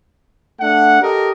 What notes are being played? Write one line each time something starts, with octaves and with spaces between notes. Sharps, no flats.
A3 D4 F#5
G4 A4 A#4 D#5